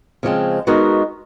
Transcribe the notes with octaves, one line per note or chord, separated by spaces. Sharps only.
C#3 F3 G#3 C4
G#3 B3 D#4 F#4 A#4